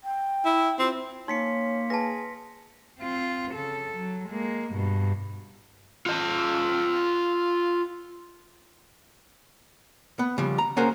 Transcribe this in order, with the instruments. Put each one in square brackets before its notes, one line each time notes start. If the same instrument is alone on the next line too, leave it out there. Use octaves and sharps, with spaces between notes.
[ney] G5
[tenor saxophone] E4
[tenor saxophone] C4 [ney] F4
[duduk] A#3 [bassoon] C#4 [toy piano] D#4 [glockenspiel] C6 B6 C#7
[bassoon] G#4 [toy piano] B4 A5 [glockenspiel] A#6
[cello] C4 F4
C#3 A4
F#3
G#3 A#3
G2 B2
[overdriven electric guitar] F4 D#5
[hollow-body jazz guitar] B3
C#3 F3 G3
A#5
A#3 C#4 F#4 G#4 A#4 C5